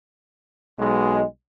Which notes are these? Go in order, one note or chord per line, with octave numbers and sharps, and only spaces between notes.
B1 B2 G#3